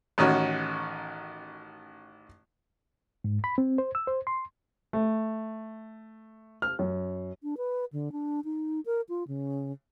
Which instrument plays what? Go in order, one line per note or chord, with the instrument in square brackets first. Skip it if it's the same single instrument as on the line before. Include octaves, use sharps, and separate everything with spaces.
[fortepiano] A1 D#3 C#4 F#4
[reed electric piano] G#2
B5
C4
C5
E6
C5
C6
[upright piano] A3
F6
F#2
[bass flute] D4
B4
D3
D4
D#4
A#4
F4
C#3